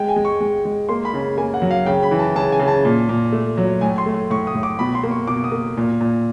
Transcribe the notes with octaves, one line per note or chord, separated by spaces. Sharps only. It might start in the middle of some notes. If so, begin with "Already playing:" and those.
Already playing: G#3 G5
G#5
G#3
C#6
G#3
G#3
A#3 C6
B5
C#3
A#3 G#5
F#5
F#3
F5
C#3 G5
B5
E3
A5
C#3 A5
G#5
C#3
A5
A#2
A#2
A3
F#3
A2 G#5
C6
A3
C6
A2 C#6
D#6
A2
D6
B2 B5
C6
A#3
C#6
B2 D6
D#6
A#3
A#2
A#2